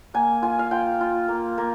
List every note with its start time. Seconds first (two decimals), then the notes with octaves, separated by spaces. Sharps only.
0.14 A#3 G#5
0.42 F4 G#5
0.59 F5
0.71 F4 G5
1.01 F4
1.28 A#3
1.58 A#3